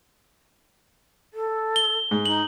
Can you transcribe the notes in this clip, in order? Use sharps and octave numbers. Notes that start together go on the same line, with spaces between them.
A4
G7
G#2
D#4 F#7